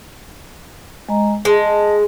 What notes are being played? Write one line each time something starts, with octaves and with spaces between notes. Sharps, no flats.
G#3 D#5 A#5
G#3 D#5 A5